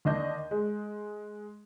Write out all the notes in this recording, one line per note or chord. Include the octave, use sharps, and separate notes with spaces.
D#2 D4 D#5 G6
G#3